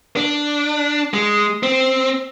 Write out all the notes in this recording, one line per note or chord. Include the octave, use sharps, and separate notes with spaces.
D4
G#3
C4